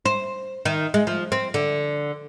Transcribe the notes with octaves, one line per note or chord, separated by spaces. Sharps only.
C5
D#3
G#3
F3
C4
D3